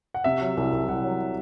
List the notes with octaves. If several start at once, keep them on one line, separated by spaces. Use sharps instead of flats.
F#5
C3 E5
F#3
C2
C2
C2 F#5
F#3